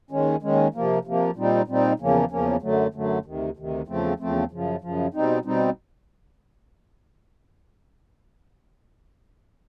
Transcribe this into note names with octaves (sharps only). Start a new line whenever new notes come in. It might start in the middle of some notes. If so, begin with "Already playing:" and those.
D#2 D#3 G#3 C#4
D#2 D#3 G#3 C#4
C3 F3 A#3
C3 F3 A#3
A#2 G3 C4 D#4
A#2 G3 C4 D#4
E2 C#3 F3 A#3 C#4
E2 C#3 F3 A#3 C#4
F#2 D3 F#3 A3
F#2 D3 F#3 A3
D2 C3 D#3
D2 C3 D#3
E2 C#3 F3 A3 C4
E2 C#3 F3 A3 C4
F#2 C#3 F3
F#2 C#3 F3
B2 G3 C4 D#4
B2 G3 C4 D#4